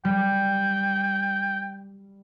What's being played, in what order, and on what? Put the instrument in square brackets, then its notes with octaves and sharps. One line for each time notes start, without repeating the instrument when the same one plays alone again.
[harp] G3 [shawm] G5